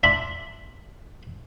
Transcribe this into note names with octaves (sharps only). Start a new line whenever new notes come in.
D4 F4 E5 B5